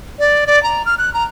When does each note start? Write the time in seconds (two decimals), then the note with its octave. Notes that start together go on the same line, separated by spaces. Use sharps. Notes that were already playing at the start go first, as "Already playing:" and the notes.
0.19 D5
0.47 D5
0.63 A#5
0.86 F6
0.98 F#6
1.14 A#5